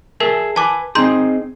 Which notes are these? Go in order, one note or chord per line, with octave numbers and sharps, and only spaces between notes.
G#4 A#4 E5 A5
B4 G#5 A5 D6
C4 D#4 G#4 A#5 C6 G6